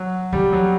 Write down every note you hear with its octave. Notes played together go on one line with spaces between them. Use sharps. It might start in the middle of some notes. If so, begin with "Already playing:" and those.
Already playing: F#3
E2 G3
F#3